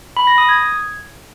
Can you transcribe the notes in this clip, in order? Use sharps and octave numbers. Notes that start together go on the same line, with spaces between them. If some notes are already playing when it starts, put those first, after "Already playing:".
B5
A#6
D#6
G#6